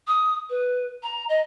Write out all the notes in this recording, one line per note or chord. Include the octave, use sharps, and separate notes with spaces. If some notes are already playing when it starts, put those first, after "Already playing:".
D#6
B4
A#5
D#5